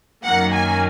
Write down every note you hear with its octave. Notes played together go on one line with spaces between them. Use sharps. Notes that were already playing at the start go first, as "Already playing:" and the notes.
F#2 D#3 F#3 A#3 F#5
G#5